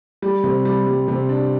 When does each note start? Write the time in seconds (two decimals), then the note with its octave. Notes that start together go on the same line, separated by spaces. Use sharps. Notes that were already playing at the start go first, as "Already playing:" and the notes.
0.22 G3
0.44 C3
0.65 G3
0.87 G3
1.08 C3
1.29 D4